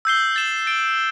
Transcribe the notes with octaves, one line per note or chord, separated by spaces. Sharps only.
E6 G6 C7 G7
A6 E7 G7
A6 D7 G7